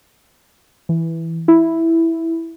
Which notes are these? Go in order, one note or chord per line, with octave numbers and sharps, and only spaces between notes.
E3
E4